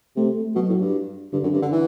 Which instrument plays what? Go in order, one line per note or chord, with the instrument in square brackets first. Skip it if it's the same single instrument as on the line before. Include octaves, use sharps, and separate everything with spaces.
[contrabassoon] C3 [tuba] A3
[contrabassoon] B2 [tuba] F#3
[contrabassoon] A2
G2
[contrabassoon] G2 [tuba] D3
[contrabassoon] F#2
G2
D3
E3